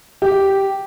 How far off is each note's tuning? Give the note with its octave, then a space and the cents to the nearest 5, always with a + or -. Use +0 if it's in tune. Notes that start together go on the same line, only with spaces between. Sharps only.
G4 -5